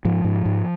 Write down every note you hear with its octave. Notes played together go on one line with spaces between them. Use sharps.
G#2 F3
G#2
G#2